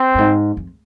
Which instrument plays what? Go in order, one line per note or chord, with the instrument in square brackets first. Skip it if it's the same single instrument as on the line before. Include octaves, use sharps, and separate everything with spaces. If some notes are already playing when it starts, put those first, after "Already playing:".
Already playing: [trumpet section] C4
[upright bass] F2
G#2
F2